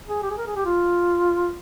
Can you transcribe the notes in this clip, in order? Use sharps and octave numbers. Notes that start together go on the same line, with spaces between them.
G#4
G4
G#4
A#4
G#4
G4
F4